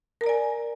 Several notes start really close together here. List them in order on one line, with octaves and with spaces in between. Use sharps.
A#4 A#5 D5 G#5